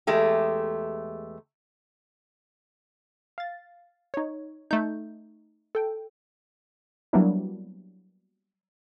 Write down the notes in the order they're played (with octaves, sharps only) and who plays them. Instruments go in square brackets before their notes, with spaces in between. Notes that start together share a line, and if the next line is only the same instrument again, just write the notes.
[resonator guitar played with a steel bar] E2 G#3 A3 G4
[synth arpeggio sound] F5 A6
D#4 C#5
[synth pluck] A3 G6 [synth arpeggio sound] D#4
[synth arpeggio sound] A4 G5
[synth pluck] F#3 G3 A#3 B3 D4 E4